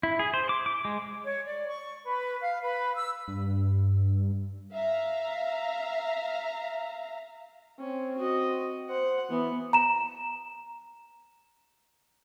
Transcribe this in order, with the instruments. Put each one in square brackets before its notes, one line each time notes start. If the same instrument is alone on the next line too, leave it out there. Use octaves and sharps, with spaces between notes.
[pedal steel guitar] E4
G#4
C5
D6
D6
G#3
[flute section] C#5
D5
C#6
B4
F5
B4
E6
[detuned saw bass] G2
[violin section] E5 F5 A#5
[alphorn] C4 [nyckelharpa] C#4
[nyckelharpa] F#4 D#5
[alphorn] C5 [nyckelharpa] F#5
[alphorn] E3 [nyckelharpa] B3
[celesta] A#5 E7